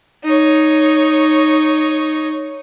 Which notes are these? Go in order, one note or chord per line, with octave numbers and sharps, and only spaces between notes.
D#4 C#5